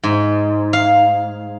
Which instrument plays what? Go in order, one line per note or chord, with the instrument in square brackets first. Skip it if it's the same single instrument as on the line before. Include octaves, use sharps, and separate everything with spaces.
[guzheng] G#2
F5